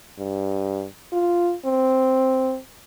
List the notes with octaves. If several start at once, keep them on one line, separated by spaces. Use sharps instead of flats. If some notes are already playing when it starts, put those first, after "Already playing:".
G2
F4
C4